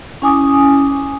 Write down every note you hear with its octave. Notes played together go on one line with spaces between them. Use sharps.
C#4 E4 G#5 D6 D#6